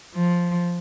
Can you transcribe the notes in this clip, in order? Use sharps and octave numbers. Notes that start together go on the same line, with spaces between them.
F3